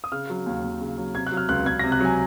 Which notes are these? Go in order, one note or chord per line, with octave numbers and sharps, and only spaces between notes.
D#6
C#3 F6
F#3
D#2
D#2
C#3
F#3
C3 G#6
F#6
F#3
F6
C#2 F#6
C#2 G#6
C3 A#6
F#6
F#3 G#5